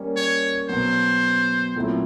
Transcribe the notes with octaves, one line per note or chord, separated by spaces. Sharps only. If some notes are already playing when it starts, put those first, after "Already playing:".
Already playing: G3 A#3 C#4
C#5
B2 F#3 B3 C5
A#2 F#3 A3 C4 E4